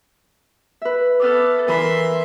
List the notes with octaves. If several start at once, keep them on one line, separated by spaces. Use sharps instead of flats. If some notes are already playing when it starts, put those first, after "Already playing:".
B4 E5
B3 A4 D6 E6 F6
E3 A#4 E5 B5 C6